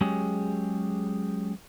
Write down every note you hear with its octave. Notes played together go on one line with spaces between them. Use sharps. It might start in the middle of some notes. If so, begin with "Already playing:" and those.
F#3 G#3 C#4 G4 G#4